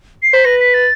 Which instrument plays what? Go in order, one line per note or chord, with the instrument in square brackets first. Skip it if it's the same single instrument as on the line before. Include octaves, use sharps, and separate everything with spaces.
[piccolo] C7
[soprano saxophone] C5 [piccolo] B6
[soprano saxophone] B4 [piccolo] A#6
[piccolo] B6
A6